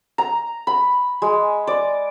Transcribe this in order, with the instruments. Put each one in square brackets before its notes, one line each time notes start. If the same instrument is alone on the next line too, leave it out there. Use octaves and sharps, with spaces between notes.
[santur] A#5
B5
G#3
D5